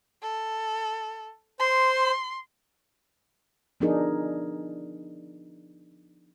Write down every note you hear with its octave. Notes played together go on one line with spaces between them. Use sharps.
A4
C5 C6
F3 B3 D4 D#4 G#4 A#4